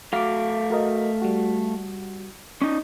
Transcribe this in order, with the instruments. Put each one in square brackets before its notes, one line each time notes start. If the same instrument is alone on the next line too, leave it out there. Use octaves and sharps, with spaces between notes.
[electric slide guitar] A3 F5 [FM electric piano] F#4 D6
[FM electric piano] F#4 A#4 D#5
G3 F#4
[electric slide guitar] C#4 D#4